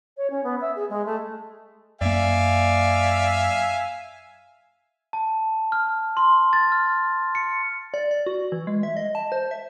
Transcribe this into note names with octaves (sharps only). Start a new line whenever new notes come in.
C#5
C#4
B3
E5
G#4
G#3
A3
F#2 A#3 D5 E5 F5 G#5
A5
F6
C6
A6
F6
C#7
D5
D5
F#4
E3
G#3
E5
D#5
A5
C5
E5